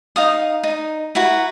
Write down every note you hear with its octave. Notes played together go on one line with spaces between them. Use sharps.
D#4 F5 D#6
D#4
E4 F#4 B4 A#5